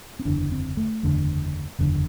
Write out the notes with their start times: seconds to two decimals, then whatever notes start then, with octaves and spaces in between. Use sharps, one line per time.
0.19 C4
0.25 F#1 E2 D3 D4
0.52 C4
0.77 A3
1.03 F#1 E2 D3
1.79 F#1 E2 D3